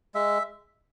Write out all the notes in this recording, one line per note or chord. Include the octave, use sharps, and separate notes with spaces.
G#3 E5